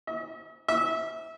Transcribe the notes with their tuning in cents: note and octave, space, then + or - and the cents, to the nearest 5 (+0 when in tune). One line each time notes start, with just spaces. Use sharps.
E5 -45
E5 -25